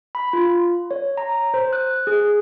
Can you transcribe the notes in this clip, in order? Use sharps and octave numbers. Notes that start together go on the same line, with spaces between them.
B5
F4
C#5
A#5
C5
F#6
G#4